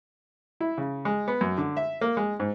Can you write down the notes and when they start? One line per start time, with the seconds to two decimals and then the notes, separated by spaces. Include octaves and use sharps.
0.60 E4
0.78 C#3
1.05 G#3
1.28 B3
1.41 F#2
1.58 D3
1.77 E5
2.01 A#3
2.17 G#3
2.40 G#2